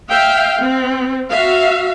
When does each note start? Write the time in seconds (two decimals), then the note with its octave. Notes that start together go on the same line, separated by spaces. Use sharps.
0.10 E5 F5 G5
0.61 C4
1.32 F#4 E5 F5